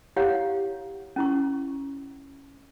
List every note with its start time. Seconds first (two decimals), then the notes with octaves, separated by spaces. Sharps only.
0.16 E4 G4 C#5 F5 F#5
1.16 C#4 E4 C#6